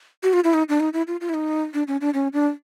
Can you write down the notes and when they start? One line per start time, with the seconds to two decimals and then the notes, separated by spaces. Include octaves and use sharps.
0.23 F#4
0.33 F4
0.44 E4
0.54 D#4
0.69 D4
0.80 D#4
0.93 E4
1.07 F4
1.21 F4
1.29 E4
1.34 D#4
1.74 D4
1.87 C#4
2.01 D4
2.14 C#4
2.33 D4